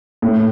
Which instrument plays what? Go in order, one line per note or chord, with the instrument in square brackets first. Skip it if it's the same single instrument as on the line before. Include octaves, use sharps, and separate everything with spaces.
[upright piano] A2